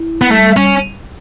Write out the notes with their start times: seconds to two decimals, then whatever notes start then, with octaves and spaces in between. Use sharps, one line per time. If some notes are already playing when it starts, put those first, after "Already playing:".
Already playing: E4
0.22 B3
0.31 G3 A3
0.57 C#4